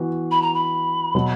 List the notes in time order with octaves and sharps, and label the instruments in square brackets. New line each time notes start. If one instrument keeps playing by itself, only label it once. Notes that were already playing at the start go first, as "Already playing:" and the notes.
Already playing: [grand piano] E3 B3 F#4
[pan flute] B5
A#5
B5
[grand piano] B2 F#3